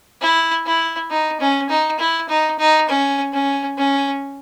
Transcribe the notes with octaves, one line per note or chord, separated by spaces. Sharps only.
E4
E4
D#4
C#4
D#4
E4
D#4
D#4
C#4
C#4
C#4